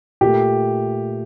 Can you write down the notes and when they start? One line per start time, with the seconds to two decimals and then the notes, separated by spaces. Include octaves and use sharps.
0.21 A#2 A3 G4